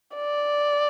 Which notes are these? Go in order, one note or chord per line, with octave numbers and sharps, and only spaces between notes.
D5